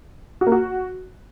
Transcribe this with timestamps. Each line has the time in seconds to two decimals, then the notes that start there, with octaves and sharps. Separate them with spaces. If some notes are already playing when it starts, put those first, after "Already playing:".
0.41 F#4
0.47 A#3
0.52 F#4